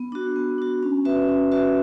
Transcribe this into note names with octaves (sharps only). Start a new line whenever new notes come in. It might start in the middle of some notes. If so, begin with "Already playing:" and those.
Already playing: B3
D4 F#4
B3
D4 F#4
C#4
F#4 B4 E5
C#4
F#4 B4 E5